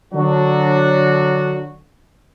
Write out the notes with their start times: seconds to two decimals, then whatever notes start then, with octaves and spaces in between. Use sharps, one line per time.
0.14 D3 F#3 D4 F#4